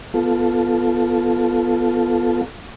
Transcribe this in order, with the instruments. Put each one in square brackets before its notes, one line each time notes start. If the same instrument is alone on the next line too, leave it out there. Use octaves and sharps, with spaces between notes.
[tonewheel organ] B3 F4 A4